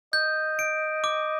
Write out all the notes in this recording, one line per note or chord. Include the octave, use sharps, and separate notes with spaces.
D#5 G6
D7
D6